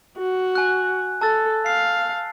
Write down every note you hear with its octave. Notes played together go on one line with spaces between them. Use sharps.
F#4
G#5 F#6
A4 A5 E6 A6
F5 C7